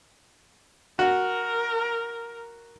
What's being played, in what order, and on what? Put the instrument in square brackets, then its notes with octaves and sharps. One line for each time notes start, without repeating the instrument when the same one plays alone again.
[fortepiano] F#4 [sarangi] A#4